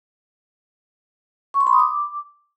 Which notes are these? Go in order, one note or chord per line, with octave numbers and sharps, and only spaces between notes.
C#6
C6
B5
D#6
D6